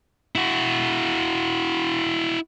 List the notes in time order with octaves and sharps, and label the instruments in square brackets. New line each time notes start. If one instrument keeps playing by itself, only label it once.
[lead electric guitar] E4 F#4